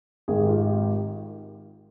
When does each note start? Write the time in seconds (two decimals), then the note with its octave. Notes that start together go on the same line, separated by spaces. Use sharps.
0.28 G#1 G#2 D#3 G#4
0.38 G4
0.49 F4
0.59 G4